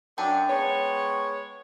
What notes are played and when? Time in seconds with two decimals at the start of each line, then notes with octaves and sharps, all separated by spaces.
0.18 F#2 D4 G5 A5
0.50 G#3 B3 C#5